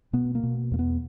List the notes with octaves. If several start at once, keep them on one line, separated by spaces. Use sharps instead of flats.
B2 B3
A#3
B2
E2 A#3
B3